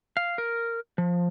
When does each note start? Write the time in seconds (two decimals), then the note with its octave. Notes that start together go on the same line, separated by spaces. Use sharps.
0.17 F5
0.38 A#4
0.98 F3